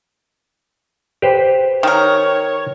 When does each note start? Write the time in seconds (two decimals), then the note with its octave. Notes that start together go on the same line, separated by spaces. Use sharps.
1.22 G4 B4 C5
1.83 D#3 A#4 C#5